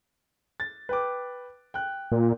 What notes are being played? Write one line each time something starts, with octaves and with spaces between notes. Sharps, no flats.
A6
B4 G5 D6
G5 F#6
A#2